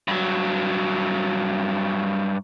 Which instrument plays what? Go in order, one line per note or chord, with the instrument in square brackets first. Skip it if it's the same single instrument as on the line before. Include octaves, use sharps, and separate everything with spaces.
[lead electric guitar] G2 F#3